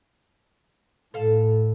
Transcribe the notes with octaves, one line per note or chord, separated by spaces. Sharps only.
A2 A4 F5